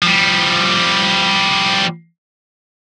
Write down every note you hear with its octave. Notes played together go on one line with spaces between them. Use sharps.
F3 G3